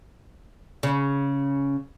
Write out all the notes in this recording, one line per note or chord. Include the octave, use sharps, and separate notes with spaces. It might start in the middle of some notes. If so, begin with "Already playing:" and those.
C#3